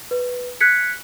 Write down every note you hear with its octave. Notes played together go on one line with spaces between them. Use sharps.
B4
F#6 G#6 B6 C#7